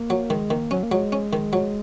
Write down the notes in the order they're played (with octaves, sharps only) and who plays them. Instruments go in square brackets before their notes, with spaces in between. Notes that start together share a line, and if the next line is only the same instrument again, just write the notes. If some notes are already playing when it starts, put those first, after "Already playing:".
Already playing: [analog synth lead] A#3
[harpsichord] F#3
[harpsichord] D#3 [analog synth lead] G#3
[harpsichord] D#3 [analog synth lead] A#3
[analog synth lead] F#3 [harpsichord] C#4
[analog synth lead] A#3
[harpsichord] F#3 [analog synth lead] G#3
[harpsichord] C#4
D#3
F#3